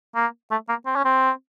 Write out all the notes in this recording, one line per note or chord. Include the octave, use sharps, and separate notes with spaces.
A#3
A3
A#3
C4
C#4
C4